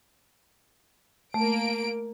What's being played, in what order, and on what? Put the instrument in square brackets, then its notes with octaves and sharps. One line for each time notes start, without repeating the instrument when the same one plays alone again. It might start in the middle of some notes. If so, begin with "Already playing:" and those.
[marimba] A3 [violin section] A#3 D7